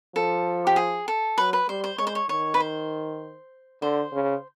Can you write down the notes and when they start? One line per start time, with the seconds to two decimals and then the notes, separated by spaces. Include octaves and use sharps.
0.15 F3 A4
0.67 G4
0.76 G#4
1.08 A4
1.37 F#3 B4
1.53 B4
1.68 G3 C5
1.84 C5
1.98 G#3 C#5
2.07 C5
2.15 C#5
2.29 D#3 C#5
2.54 B4
2.60 C5
3.82 D3 C5
4.13 C#3